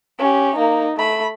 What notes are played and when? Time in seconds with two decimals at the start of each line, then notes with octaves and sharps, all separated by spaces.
0.19 C#4 G4
0.56 A#3 D#4
0.97 A3 B5